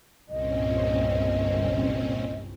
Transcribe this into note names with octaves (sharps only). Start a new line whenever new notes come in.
G1 C2 G2 A#2 C4 C#4 D#5